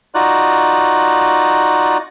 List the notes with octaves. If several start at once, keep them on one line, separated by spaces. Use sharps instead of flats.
D#4 F4 F#4 D5 F#6